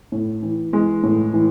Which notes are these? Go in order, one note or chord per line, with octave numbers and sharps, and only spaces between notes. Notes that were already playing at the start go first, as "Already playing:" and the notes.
A2
E3
E3 G#3
A2
E3